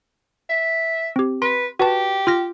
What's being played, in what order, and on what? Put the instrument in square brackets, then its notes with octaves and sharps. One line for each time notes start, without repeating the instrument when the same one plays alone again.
[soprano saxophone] E5
[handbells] C4 G4
[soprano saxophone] B4 [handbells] C6
[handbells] F#4 B4 A5 [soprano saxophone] G4
[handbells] F4 F6 A#6